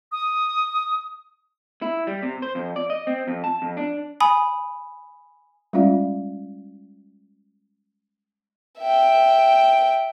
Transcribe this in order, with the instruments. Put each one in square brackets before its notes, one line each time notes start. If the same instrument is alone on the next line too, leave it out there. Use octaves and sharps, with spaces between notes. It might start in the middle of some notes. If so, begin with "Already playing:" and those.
[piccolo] D#6
[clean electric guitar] E4
G3
C3
C5
F2
D5
D#5
C4
F2
A5
F2
D4
[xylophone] G#5 B5 D#6
[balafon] G3 G#3 C#4 F4 D5 F5
[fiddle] E5 G5